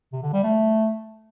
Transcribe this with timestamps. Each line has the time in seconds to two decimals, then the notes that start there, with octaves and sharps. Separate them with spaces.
0.13 C3
0.23 D3
0.33 G3
0.43 A3